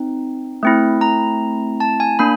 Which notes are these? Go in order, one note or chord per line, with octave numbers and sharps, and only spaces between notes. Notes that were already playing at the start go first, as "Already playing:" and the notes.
Already playing: C4 D#4
A3 C4 E4
A#5
A5
G#5
A#3 D4 B5